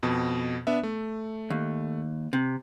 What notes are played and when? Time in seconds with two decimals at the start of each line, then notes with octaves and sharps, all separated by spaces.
0.03 F2 B2
0.67 B3 D4 E5
0.83 A3
1.50 D#2
2.33 C3